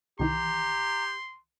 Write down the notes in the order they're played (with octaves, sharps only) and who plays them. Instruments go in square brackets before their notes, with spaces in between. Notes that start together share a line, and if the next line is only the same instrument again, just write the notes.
[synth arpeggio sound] C2 D#3 E3 [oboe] G4 [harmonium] A#5 [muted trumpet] C6